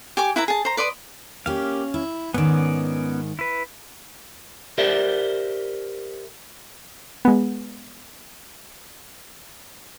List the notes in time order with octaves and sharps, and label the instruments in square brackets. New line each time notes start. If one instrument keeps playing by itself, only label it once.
[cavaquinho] G4 G#5 D6
E4 B4 E5 A#5
G#4 A5
C5 A#5
B4 D5 C6 D#6
[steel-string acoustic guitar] A#3 G4 [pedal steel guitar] C#4 F5
[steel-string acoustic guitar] E4
[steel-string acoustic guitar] G#2 D#3 [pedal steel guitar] B3 C#4 D5
[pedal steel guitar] E4 B4
[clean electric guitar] G4 A#4 C5 D5 E5
[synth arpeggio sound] G#3 B3